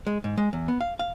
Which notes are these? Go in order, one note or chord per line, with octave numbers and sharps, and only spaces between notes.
G#3
G#2
G#3
E2
B3
F5
F5